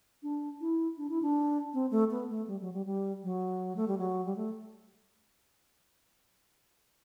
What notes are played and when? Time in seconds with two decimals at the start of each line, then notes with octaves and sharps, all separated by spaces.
0.23 D4
0.61 E4
0.98 D4
1.10 E4
1.22 D4
1.74 C4
1.91 A3
2.11 B3
2.30 A3
2.48 G3
2.61 F#3
2.73 G3
2.86 G3
3.23 F#3
3.76 A3
3.88 G3
3.98 F#3
4.26 G3
4.36 A3